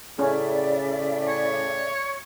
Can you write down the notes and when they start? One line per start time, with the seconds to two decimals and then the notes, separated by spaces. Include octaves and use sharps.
0.19 A2 C#3 C#4 D5 E5
1.28 C#5